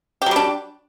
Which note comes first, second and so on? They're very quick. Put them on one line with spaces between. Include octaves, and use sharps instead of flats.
G4 F#3 G3 D4